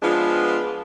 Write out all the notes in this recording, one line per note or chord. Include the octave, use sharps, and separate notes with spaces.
F3 G#3 B3 D4 F4